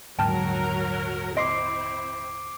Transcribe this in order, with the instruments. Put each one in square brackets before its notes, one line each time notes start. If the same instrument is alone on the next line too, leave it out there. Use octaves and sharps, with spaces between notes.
[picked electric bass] D#1 G#2 D3 [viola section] F#3 A#4 [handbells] G5 A5 F6
[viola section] C4 E4 [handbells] D#5 C6 [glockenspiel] D6 C7 D7